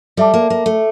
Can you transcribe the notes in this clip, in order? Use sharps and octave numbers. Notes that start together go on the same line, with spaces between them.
G3 A4 E5 A5 D6
A#3
A#3
A3